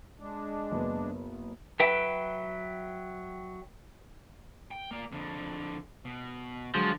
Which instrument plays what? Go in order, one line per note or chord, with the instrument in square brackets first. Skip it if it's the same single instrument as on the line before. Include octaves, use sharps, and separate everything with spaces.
[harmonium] G#3 D4
[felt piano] F#1 B3
[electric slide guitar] F#3 E5 G5 [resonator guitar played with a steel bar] B4
[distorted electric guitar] G5
A#3 D5
F2 D3
B2
[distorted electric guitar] D3 [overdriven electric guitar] F3 [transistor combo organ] F#3 G#3